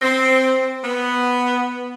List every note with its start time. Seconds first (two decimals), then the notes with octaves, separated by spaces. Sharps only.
0.02 C4
0.84 B3